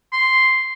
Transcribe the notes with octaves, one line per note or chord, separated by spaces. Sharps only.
C6